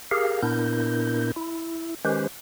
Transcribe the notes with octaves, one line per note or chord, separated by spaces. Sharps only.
G4 G#4 A#4 F5
A#2 B3 D4 E4 A#4 G6
E4
D#3 G#3 C#4 G4 B4 C5